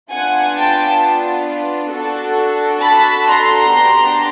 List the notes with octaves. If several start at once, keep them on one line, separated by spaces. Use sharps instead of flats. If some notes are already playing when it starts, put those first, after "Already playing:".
B3 D4 F4 F#5 G#5
G5 A5
D4 F#4 A4
A5 B5
A#5 C6
B3 D4 G4